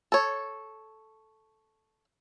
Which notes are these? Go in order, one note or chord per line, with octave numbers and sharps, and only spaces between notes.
A4 C#5